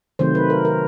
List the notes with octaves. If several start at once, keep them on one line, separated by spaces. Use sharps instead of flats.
C3 D#3 F#3 A3 C4 C5
B4
A#4
A#4